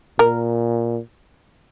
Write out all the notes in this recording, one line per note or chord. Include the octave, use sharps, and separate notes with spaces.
A#2 A#4